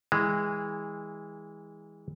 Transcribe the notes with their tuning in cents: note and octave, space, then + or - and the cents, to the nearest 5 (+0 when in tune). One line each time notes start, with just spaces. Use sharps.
E3 -20 G#3 -15